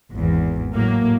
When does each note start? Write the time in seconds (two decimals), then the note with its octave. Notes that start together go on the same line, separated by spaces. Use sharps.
0.13 G#1 E2
0.74 A2 F#3 A#3